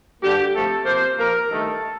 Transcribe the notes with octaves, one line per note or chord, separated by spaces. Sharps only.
G2 D3 G3 A#3 G4
C3 F3 A3 A4
C3 F3 A#3 C5
A#2 F3 A#3 A#4
G2 D#3 A3 A4